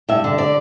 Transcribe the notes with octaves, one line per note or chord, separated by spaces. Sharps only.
G2 E5
D3
D5